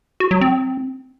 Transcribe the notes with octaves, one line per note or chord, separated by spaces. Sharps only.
F#4
F#3
C4